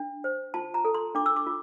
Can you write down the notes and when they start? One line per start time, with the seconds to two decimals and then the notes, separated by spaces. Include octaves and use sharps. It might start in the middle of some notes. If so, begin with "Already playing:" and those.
Already playing: D4
0.24 C5
0.54 F4 A5
0.74 A#5
0.85 A4
0.94 C6
1.15 D4 D6
1.26 E6
1.36 D6
1.46 F4